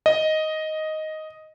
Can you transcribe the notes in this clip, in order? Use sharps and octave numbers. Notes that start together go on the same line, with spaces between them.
D#5